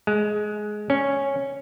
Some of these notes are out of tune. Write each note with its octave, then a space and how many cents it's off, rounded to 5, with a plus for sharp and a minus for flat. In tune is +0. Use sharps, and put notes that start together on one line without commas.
G#3 +15
C#4 -5